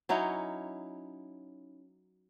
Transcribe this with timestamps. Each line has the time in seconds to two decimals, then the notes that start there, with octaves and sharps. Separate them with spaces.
0.09 F#3 C#4 D#4 E4